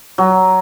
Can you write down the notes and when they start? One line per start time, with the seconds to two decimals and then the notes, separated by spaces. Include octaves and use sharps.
0.18 F#3